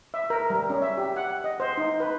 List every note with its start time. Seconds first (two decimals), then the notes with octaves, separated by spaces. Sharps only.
0.14 E5
0.30 A#4
0.50 G3
0.70 C#4
0.82 E5
0.97 G4
1.16 F#5
1.44 D#5
1.60 C5
1.77 D#4
2.00 B4